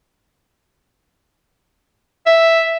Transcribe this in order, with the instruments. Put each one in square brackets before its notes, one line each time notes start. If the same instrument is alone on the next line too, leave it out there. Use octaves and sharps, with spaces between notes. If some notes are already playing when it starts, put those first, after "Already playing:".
[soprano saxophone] E5